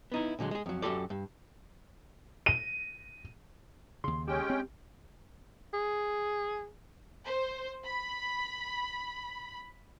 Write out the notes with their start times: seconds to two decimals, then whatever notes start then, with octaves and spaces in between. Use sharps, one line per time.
0.12 B3 D#4 E4
0.39 A#2 D3 F#3 G#3
0.51 G#3 G#4
0.66 F2 F#3
0.82 F#2 F#4 G4 A4 D5
1.10 G2
2.46 D#7
4.04 D#2 C#3 C6
4.28 G#3 C#4 G4 G5
4.50 C4
5.73 G#4
7.25 C5
7.85 B5